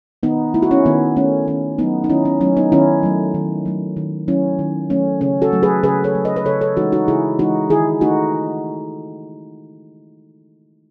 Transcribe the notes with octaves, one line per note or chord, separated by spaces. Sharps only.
D#3 B3 D#4
A3 E4
F#4
C#4 E4
D#3 B3
A3 C#4
D#3 C#4
F#3 A3 B3 D#4
D#4
D#3 C#4 E4
C#4
F#3 A3 C#4
B3 D#4
D#3 C#4 E4
F#3 A3
D#3
F#3 A3
D#3
F#3 A3 C#4 E4
D#3
F#3 A3 C#4
C#3 C#4
F#4 A4
F#3 A3
G#4 B4
C#3 G#4 B4
A4 C#5
F#3 A3
B4 D#5
B4
C#3 A4 C#5
A4 C#5
E3 G#3 D#4 F#4
D#4 F#4
C#3 E4 G#4
E3 G#3 D#4 F#4
D#3 E4 G#4
A3 D#4 F#4